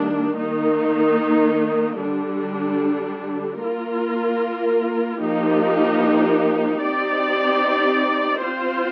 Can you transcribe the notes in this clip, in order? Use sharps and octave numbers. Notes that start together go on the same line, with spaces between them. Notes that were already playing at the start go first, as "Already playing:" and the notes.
Already playing: D#3 G3 A#3 D4
D#3 A#3 D#4
D3 G3 D4
A#3 F4 A#4
F3 A#3 D#4 G4
C4 D#4 G4 D5
C4 F4 C5